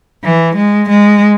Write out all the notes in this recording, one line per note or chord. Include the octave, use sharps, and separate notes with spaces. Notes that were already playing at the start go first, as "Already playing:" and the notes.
E3
G#3
G#3